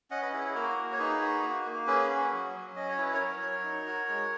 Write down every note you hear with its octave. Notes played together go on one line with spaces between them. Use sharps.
C#4 D#5 F#5
B4 D#5
E4 G#4 B4
G#4
A#3 F#4 A#4
A#3
C#5
D#4 G#4 B4
F#4
A#3
A#3
C#4 G#4 B4
F#4
F#3
F#3
C#4 D#5
C#5
E4 B4
A#4 C#5
F#3
F#3
D#4
F#4
G#3